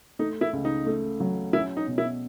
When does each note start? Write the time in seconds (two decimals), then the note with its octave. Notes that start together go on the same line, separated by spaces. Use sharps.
0.19 A3 D#4
0.41 E4
0.53 C#2
0.65 D#4
0.86 A3
1.20 F#3
1.53 C#4 E4
1.77 D#4
1.87 B2
1.98 E4